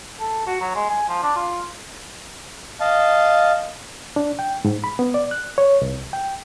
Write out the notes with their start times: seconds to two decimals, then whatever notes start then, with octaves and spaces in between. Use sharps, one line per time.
0.20 A4
0.46 F#4
0.61 F#3
0.75 G#3
0.90 G#5
1.09 F3
1.22 D4
1.36 F4
2.80 D#5 F5 A5
4.16 D4
4.39 G5
4.65 G#2
4.84 B5
4.99 B3
5.14 D5
5.31 F#6
5.58 C#5
5.81 C2
6.13 G5